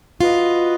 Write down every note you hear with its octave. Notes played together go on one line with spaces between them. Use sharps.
F4 F#4 B4 D#5